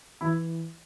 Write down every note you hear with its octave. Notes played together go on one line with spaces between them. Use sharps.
E3 E4